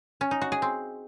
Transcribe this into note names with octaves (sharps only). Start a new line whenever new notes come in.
C#4
D#4
F#4
G#4
C4